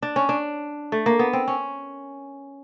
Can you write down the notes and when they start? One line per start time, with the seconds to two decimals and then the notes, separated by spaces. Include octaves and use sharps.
0.02 D4
0.16 C#4
0.29 D4
0.92 A3
1.06 A#3
1.19 B3
1.33 C4
1.48 C#4